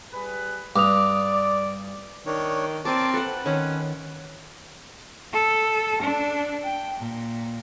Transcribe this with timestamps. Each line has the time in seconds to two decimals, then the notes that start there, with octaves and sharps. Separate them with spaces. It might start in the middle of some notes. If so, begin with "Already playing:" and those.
0.12 G3 G#4 B4
0.76 G2 D5 D6 D#6 F7
2.26 D#3 D4 C#5
2.85 C4 A#4 D5 A5 D6
3.14 A4 B4 F#5
3.46 D#3 C#4
5.33 A4
6.01 D4
6.64 G5
6.99 A#2